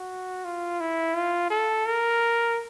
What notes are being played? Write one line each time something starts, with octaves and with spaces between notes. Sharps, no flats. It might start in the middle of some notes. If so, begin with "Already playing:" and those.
Already playing: F#4
F4
E4
F4
A4
A#4